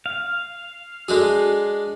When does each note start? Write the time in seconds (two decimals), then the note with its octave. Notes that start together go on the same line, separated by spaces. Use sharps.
0.06 F5
1.08 G#3 D4 F#4 G#4 A4